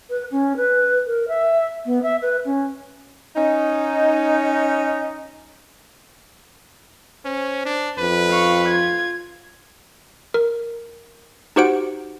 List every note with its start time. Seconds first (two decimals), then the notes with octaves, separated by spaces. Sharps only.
0.10 B4
0.31 C#4
0.57 B4
1.06 A#4
1.28 E5
1.86 B3
2.03 E5
2.22 B4
2.45 C#4
3.36 C#4 D#4
7.25 C#4 C5
7.65 D4
7.98 F2 B4
8.30 F5 C#6
8.68 F4 G#6
10.34 A#4
11.56 D#4 F#4 G4 C5 F#5 D7